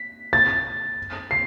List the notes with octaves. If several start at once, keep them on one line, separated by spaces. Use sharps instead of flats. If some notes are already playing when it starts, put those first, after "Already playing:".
Already playing: B6
A6
C7